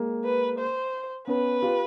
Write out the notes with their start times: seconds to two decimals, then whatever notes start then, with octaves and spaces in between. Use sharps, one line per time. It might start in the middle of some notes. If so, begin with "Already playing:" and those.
Already playing: G#3 A#3
0.25 B4
0.59 C5
1.27 B3 C#4 B4
1.62 F4 G4